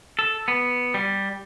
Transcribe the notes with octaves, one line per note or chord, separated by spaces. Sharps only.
A4
B3
G3